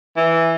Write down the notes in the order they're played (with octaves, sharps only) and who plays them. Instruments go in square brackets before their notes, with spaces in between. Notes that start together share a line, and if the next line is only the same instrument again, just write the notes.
[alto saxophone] E3